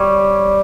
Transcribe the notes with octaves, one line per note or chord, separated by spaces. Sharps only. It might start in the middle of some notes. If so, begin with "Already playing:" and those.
Already playing: G3 C#5